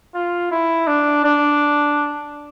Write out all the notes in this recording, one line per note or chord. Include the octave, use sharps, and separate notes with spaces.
F4
E4
D4
D4